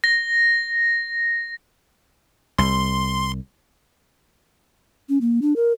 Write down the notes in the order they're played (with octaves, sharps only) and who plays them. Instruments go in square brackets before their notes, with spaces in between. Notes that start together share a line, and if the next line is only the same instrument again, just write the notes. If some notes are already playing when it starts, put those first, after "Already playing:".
[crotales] A#6
[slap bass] C2 [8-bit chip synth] C6
[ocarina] C#4
A#3
D4
A#4